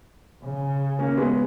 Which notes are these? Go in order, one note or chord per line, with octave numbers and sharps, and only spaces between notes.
C#3
A#3 C#4
G#3 B3